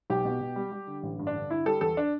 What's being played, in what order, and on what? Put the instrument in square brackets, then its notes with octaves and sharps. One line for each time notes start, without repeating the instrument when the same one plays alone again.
[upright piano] B1 G4
B2
B2
G3
G3
D3
A1
G2
D4
D3
D3 E4
G3 A4
E2 A4
D4